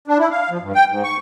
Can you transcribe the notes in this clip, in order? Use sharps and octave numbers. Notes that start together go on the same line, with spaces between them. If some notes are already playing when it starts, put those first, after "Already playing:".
D4
E4
F5
F3
G2
G5
G#2
C#6